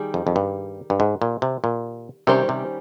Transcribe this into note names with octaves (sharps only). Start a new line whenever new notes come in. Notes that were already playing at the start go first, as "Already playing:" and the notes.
Already playing: D#3 G3 G#4
F2
F2
G2
G2
G#2
A#2
C3
A#2
C3 D#3 G3 C#4 G4 C5
C3